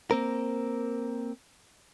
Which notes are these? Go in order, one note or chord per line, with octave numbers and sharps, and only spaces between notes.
A#3 C4 A#4